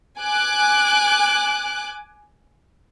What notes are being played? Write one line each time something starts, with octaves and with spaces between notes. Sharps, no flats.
G#5 D6 F#6